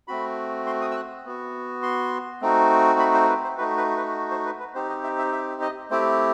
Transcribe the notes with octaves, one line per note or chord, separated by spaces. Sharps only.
A3 C4 F#4 B5
C6
D#6
E6
F#6
B3 F#4
C6
A3 C4 D#4 F#4
B5
C5
B4
C5
A3 D#4 F#4 B4
B4
B4
C5
B4
B4
C4 D#4 G4 C5
D#5
E5
E5
E5
D#5
A3 C4 E4 G4 C5